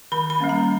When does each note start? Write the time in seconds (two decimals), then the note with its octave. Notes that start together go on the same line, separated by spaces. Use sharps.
0.12 D#3 B5
0.30 B5
0.40 G3 A#3 C#4
0.49 A#5